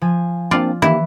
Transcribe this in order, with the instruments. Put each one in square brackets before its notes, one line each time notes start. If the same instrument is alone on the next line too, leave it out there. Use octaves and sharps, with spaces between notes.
[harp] F3 G#5
[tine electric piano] A#3 C4 D4 [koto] F4 D5
[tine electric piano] D#3 A#3 G4 [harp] E3 [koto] E4